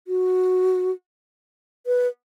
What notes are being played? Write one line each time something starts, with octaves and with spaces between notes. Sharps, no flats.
F#4
B4